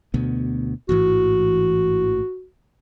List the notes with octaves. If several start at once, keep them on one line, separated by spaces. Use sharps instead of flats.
D2 B2 B3
A1 G#2 E3 F#4